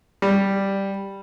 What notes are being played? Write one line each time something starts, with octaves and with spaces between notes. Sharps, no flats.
G3